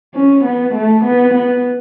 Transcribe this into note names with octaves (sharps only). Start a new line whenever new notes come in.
C#4
B3
A3
B3
B3